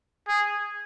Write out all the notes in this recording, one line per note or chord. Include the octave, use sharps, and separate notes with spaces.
G#4